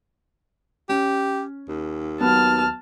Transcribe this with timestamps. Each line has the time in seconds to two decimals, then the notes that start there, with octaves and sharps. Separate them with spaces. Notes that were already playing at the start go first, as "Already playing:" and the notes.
0.89 C#4 G4
1.68 D#2
2.20 F#3 B3 A5 F6